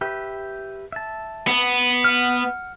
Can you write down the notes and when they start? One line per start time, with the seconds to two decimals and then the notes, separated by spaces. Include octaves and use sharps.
0.01 G4 B4 E5
0.92 E5 A5
1.48 B3
2.04 F#5 F6